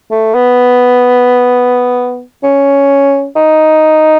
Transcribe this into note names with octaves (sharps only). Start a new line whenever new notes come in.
A3
B3
C#4
D#4